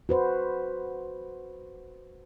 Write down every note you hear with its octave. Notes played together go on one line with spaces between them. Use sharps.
F#4 B4 C5